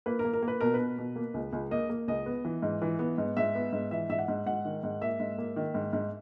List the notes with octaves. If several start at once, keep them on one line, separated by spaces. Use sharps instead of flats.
A#3 B4
A#4
A#3
A#4
A#3
B4
B2 A#4
B4
B2
B2
A#3
C#2
C#2
A#3 D#5
A#3
C#2 D#5
B3
E3
G#2
E3
B3
G#2
G#2 E5
B3
G#2
E3 E5
G#2 E5
F#5
G#2
G#2 F#5
D#3
G#2
A#3 E5
G#2
A#3
D#3
G#2
G#2